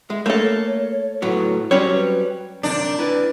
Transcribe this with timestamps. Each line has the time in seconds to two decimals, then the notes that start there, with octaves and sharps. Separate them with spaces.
0.10 G#3 E5
0.26 A3 A#3 A4 C#5
1.22 A2 F#3 B3 E4
1.71 F#3 G3 C4 C#4 C#5 D5
1.92 B4
2.63 F#2 C3 D#3 D4
2.99 E4 B4 D5